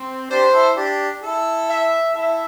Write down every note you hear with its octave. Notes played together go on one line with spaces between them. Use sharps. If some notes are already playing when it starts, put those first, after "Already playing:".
Already playing: C4
D4 G4 C5
E4 A4
D4 G4
E4 A4
E5
E4 A4 E5